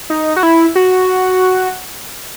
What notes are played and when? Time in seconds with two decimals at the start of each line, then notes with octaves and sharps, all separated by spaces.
0.10 D#4
0.36 F#4
0.43 E4
0.76 F#4